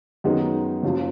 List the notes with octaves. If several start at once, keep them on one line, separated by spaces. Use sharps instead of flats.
F#2 D#3 G#3 B3 D#4
F#1 F#2 F3